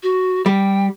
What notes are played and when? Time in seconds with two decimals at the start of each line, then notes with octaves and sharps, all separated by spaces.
0.03 F#4
0.46 G3 G5